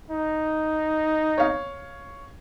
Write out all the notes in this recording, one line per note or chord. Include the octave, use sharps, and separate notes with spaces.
D#4
C#5 F5